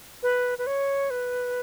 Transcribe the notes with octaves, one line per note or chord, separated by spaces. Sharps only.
B4
B4
C#5
B4